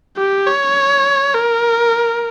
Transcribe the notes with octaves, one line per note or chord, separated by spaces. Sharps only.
G4
C#5
A#4